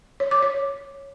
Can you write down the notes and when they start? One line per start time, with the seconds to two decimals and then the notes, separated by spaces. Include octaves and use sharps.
0.20 C#5
0.31 D6
0.43 C#5